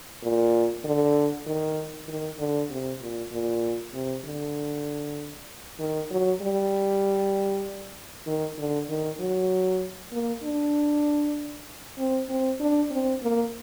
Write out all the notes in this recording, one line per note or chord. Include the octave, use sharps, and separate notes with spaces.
A#2
D3
D#3
D#3
D3
C3
A#2
A#2
C3
D3
D#3
F#3
G3
D#3
D3
D#3
F#3
A#3
D4
C4
C4
D4
C4
A#3